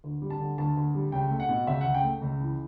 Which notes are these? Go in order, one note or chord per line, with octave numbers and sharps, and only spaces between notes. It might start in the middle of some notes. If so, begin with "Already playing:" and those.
D2
G3
A5
D3
D2 A5
D2
G3
C#2 G5
A3
F#5
B2
C#2 E5
C#2 F#5
G5
A3
C#2
E3